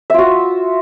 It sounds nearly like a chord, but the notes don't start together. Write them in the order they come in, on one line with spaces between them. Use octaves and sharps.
E5 F4 F#4